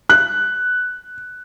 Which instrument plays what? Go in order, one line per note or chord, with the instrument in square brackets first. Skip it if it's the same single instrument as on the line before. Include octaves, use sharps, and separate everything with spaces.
[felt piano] F#6